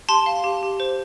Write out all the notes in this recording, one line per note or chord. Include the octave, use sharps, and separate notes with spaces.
G4 A5 C6
F5
G4
G4
C5